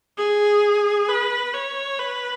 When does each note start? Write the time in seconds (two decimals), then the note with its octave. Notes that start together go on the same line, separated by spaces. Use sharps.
0.18 G#4
1.09 B4
1.54 C#5
1.99 B4